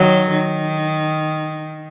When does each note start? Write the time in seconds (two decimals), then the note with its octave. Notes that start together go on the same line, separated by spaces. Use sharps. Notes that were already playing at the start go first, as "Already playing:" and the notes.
Already playing: D#3 F#3
0.30 D#3